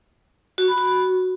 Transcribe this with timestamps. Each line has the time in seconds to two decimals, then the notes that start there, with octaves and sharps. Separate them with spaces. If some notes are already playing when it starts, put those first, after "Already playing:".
0.58 F#4
0.68 B5
0.78 F#4